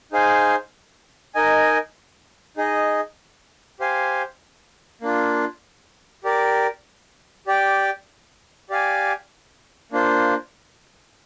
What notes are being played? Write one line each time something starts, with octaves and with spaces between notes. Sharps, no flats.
D#4 G#4 C5 F5 G#5
D#4 A#4 D#5 G#5
D#4 G#4 D#5
G4 C5 F5 G#5
A#3 D4 F4
G4 A#4 D5
G4 D5 G5
G4 D5 F5 G#5
A#3 D4 F4 C5